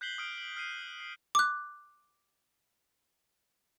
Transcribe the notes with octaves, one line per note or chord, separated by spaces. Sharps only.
F#6 G6 B6 C7 F#7 G7
D#6 F6 D7 G7
F#7
F6 C7 D#7
C7
D6 F#6